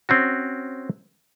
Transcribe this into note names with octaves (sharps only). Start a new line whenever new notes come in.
C4 C#4 F#4